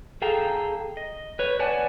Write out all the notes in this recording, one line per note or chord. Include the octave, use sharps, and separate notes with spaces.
G#4 A4 F5 G5 A#5
D#5
B4 C#5
B4 C#5 D5 F#5 G#5 A5